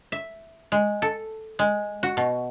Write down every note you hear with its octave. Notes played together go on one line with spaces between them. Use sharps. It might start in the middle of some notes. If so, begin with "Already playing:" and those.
E5
G#3
A4
G#3
F#4
B2